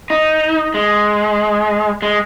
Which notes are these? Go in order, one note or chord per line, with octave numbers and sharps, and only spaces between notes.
D#4
G#3
G#3